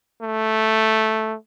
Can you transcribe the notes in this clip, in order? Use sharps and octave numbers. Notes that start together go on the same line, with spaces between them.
A3